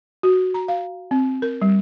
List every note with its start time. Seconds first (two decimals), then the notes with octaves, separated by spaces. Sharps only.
0.23 F#4
0.54 A#5
0.68 F5
1.11 C4
1.42 A#4
1.62 G3